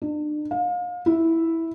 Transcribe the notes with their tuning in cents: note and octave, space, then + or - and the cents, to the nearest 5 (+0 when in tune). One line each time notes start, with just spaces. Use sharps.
D4 +40
F5 +35
E4 -5